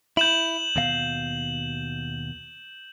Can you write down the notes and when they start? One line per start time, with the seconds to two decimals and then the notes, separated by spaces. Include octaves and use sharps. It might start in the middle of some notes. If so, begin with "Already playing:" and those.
0.17 E4 G6 E7 F#7
0.76 D#2 B2 F5